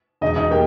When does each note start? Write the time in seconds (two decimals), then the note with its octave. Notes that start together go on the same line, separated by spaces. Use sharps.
0.21 E1 D#4 D#5
0.36 D#4 D#5
0.51 A#3 G4 G5